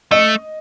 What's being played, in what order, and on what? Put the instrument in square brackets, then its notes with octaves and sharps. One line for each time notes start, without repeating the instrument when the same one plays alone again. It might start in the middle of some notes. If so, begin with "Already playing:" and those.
[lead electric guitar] A3 [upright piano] D#5